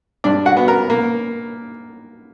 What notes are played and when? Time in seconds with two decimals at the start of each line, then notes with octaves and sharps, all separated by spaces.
0.24 G2 D4 D5
0.46 F#4 F#5
0.57 B3
0.68 A#4 A#5
0.90 A#3